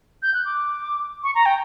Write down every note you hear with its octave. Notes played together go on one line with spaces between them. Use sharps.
G6
F#6
D6
C#6
A#5
G5